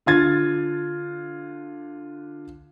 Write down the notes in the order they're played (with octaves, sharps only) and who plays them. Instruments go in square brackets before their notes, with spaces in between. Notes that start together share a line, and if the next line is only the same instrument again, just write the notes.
[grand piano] D3 F4 G#6 A6